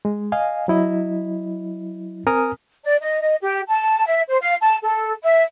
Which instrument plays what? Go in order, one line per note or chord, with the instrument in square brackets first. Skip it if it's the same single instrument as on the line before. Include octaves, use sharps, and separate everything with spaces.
[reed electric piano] G#3
D#5 F5 G#5
F#3 E4 D#5
C4 A#4 G#5 A#5 D#6 F6
[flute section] D5
D#5
D#5
G4
A5
E5
C5
F5
A5
A4
E5